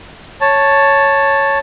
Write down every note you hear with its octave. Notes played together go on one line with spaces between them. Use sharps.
C#5 A5